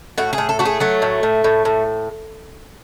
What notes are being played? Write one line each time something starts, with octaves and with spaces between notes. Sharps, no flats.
A2 F#4
G#4
A2
A4
A3 F#4
G#4
F#3 A3
A2
A2
A2
A2